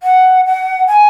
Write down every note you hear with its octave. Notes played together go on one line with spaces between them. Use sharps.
F#5
F#5
G#5